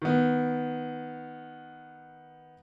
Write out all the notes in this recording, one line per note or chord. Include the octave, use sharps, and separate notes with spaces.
D#3 B3